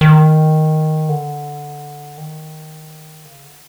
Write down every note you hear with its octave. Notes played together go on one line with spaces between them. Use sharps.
D#3
D3
D#3
C#3
D3